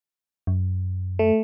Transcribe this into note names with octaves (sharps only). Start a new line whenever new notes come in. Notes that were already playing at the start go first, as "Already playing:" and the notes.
F#2
A3